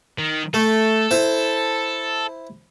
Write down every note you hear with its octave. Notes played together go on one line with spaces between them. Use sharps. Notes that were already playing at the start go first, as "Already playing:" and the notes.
D#3
A3 A4
E4 C5